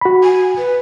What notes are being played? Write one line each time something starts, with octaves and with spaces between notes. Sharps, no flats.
F#4 B5
G#5
B4